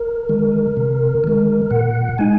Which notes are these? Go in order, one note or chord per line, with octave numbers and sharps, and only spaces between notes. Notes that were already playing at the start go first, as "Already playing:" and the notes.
Already playing: A#4
D#3 G#3
C3
D#3 G#3
A#2 F#5
G#3 D#4 G#5